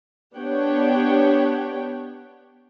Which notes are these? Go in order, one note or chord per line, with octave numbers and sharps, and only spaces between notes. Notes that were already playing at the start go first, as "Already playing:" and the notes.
B3 D4 G4 C#5 F#5 G5